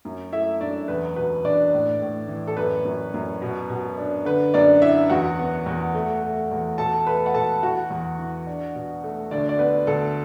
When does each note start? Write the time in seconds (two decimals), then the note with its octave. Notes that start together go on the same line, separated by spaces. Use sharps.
0.05 F#2
0.32 A3 E4 E5
0.61 F#2 D4 D5
0.88 E2 B4
1.16 B2 B4
1.44 E2 D4 D5
1.73 A2
2.02 A2
2.29 E3
2.47 A4
2.57 F#2 B4
2.85 F#2
3.14 F#2
3.42 B2
3.70 B2
3.97 D4
4.25 D3 B4
4.54 F#2 D4 D5
4.82 D4 E4 E5
5.10 E2 F#4 F#5
5.39 B3
5.66 E2
5.95 A3
6.22 A3
6.51 E2
6.78 B2 A4 A5
7.07 A3 B4 B5
7.26 F#5
7.34 B2 A4 A5
7.63 E3 F#4 F#5
7.90 E2
8.19 E3
8.47 D4
8.75 B2
9.04 A3
9.31 D2 D4 D5
9.49 D5
9.59 B3 B4
9.87 D2 A4